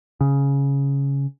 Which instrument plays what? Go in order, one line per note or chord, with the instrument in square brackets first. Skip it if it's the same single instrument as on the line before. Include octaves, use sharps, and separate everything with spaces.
[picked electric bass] C#3